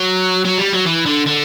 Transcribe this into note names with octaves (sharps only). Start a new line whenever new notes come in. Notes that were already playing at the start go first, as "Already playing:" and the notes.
Already playing: F#3
F#3
G3
F#3
E3
D3
D3